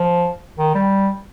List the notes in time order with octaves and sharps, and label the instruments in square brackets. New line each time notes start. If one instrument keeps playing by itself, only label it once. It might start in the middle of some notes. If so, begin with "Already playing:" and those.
Already playing: [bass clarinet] F3
D#3
G3